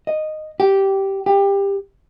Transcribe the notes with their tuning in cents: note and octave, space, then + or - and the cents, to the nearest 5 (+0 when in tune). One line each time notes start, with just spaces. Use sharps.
D#5 -10
G4 -10
G4 +20